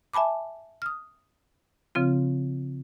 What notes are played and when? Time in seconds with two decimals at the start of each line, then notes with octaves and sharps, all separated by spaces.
0.13 E5 G#5 A5 B5 D6
0.82 D#6 F6
1.95 C#3 F3 C4 F4